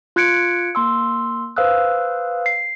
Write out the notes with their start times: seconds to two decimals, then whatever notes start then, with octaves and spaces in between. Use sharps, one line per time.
0.16 F4 F#6 G#6 C#7 D7
0.75 A#3 C6 E6
1.56 B4 C5 F5 D#6 E6 F#6
2.46 C7